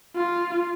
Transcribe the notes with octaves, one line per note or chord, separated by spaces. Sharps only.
F4